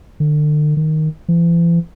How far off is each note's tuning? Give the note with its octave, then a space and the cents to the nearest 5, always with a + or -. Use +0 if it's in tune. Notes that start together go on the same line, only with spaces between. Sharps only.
D3 +40
D#3 +0
E3 +45